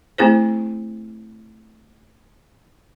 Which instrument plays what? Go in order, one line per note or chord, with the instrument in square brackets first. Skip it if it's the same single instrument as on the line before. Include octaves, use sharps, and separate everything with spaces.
[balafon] A3 C4 E4 G#4 C5